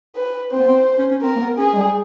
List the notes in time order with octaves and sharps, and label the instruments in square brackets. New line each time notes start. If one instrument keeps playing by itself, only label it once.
[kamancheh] B4
[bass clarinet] C4 [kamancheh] C5
[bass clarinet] B3
C4
C#4
C#4
[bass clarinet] C4 [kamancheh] A#4
[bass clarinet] A#3
B3
[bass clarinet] C#4 [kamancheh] G#4
[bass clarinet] G#3
G3